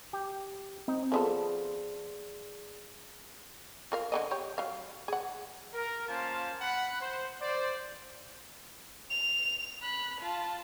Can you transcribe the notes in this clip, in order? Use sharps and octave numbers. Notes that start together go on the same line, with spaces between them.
G4
C4 D#4
F3 B3 G#4 A4 D5 C6
F4 A#4 F5
D3 C4 D#5
G4 C#5
F#3 F5
G#4 F#5
A#4
A#3 C#4 F4 C5 F5 A5
F#5 B5
C5
C5 D5
F7
B5 F#6
F4 A5